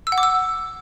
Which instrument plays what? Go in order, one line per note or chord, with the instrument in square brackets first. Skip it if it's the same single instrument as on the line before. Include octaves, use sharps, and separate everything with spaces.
[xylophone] E6
F#5
D6
E6